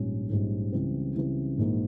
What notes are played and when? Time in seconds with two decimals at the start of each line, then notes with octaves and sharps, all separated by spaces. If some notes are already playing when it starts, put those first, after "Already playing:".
Already playing: A#1 G#2 G3 C#4
0.30 A#1 G#2 G3 C#4
0.72 C#2 C#3 E3 G3 C4
1.15 C#2 C#3 E3 G3 C4
1.58 A#1 G#2 E3 A#3